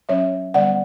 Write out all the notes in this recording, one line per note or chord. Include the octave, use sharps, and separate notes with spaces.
F#3 C#4 C#5 E5
D3 G3 B3 D5 F#5